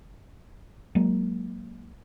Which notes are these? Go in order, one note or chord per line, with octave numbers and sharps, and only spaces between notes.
F#3 G#3 A#3